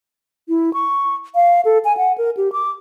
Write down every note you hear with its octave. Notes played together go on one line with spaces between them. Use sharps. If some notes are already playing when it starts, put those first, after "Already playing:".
E4
C#6
F5
A4
G#5
F#5
A#4
G4
D6